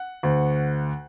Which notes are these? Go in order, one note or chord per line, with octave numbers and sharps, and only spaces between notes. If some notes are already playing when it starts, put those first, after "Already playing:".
Already playing: F#5
D2